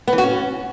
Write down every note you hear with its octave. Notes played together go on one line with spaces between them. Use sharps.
B3
E3
F#4
C#4